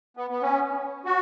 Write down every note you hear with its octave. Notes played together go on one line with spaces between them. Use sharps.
B3
B3
C#4
F#4